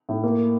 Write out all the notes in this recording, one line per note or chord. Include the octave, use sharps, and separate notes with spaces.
A2
A#3